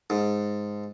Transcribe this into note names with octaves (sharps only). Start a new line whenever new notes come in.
G#2